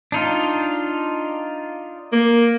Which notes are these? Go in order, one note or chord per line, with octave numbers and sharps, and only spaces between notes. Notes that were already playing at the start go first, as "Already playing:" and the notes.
D4 D#4 F4
A#3